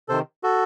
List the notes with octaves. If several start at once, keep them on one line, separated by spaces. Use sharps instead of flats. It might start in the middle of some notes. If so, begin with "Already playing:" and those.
C3 D#3 A4 C5
F#4 A4